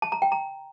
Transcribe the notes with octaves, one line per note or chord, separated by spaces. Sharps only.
A5
A#5
G5
A#5